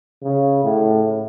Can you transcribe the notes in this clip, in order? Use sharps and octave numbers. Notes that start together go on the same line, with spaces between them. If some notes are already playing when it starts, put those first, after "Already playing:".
C#3
A2